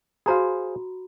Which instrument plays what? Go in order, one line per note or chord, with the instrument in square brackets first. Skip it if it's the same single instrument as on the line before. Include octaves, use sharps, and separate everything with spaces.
[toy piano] F#4 A#5 B5 [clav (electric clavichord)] G#4 C5 F5